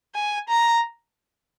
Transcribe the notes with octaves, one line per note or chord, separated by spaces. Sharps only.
G#5
A#5